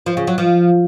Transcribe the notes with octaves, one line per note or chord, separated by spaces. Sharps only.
F3
C#3
F#3
F3